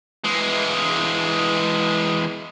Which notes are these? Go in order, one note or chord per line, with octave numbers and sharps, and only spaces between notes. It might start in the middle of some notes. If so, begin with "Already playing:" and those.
E3 G#3